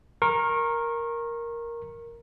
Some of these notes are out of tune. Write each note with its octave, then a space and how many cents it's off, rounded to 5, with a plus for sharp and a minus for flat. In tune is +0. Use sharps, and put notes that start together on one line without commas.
A#4 +0 C#6 -35